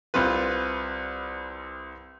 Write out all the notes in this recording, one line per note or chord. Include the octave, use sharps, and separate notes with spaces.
C2 C4 F4 B4